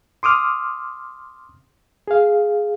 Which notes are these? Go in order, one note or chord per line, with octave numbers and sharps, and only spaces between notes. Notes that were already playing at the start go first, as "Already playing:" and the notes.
C6 D6 D#6 F6
G#4 F5